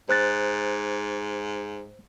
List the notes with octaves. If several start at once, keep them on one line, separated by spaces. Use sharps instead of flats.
G#2 C5 F#6 A6